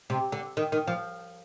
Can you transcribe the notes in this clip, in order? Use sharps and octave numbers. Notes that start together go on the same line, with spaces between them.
C3
D3
D#3
D#3
F3